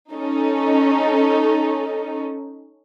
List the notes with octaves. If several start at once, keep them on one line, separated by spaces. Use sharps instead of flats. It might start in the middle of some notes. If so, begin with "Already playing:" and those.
C#4 D#4 A4